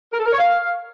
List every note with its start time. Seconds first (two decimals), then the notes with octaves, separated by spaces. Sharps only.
0.12 A#4
0.19 A4
0.25 A#4
0.32 C#5
0.39 F5